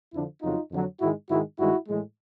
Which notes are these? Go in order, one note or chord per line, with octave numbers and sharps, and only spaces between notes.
F2 D3 F3 D4 E4
F2 C#3 F#3 D#4 F4
F2 D3 F#3
G#2 D#3 G#3 E4 F#4
G#2 D#3 G#3 E4 F#4
G2 D#3 G#3 E4 F#4
A2 E3 G#3